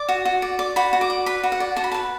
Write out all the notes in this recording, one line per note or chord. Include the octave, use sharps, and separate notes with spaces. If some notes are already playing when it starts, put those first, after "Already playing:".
Already playing: D5
F#4
F#4
D5
D5
F#4 B5
F#4
D6
D5
B4 B5
F#4
F#5
D5
F#4 A5
B5
A5
B4